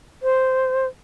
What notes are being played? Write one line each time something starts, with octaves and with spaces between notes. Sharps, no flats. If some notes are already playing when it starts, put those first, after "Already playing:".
C5